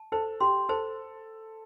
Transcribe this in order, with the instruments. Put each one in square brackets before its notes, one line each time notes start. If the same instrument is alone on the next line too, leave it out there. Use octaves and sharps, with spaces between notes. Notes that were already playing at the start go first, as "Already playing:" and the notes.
Already playing: [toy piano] A5
[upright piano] A4 [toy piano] C5
[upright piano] G4 [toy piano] C6
[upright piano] A4 [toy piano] C5